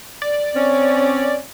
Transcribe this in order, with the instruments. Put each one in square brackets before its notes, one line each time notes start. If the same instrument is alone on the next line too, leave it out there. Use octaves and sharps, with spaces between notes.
[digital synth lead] D5
[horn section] C4 C#4